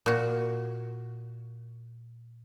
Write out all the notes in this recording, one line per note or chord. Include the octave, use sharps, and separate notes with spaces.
A#2 F#4